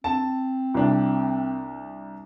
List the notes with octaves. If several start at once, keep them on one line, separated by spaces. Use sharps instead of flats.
C4 A5
C2 D4